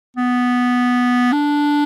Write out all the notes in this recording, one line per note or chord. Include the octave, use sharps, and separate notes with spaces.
B3
D4